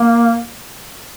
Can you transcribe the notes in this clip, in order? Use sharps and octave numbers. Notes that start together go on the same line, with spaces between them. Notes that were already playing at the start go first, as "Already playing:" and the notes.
Already playing: A#3